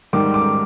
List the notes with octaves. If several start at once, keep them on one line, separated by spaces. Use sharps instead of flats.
G#2 D#3 G3 D6
D6